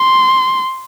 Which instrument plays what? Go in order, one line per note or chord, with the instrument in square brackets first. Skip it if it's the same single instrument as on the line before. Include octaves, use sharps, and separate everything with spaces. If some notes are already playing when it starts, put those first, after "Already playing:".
Already playing: [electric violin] C6